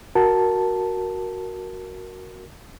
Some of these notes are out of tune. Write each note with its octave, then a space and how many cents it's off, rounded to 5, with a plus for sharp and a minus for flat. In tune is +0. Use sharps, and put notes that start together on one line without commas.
F#4 +0 A#4 +0 A5 +0